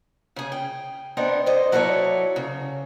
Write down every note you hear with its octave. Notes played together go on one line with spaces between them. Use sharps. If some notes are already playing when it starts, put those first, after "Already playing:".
C#3 G#4
G5
B3 C4 D4 D#4
C5 D#5
F#3 E4 A4 B4 C#5 D5
C#3